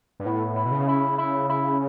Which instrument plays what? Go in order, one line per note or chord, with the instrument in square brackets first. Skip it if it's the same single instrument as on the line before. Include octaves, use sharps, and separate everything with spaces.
[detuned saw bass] G2
[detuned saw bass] A2 [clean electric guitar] B3
[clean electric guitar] E4
[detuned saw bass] B2
C#3
[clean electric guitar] E4
E4
E4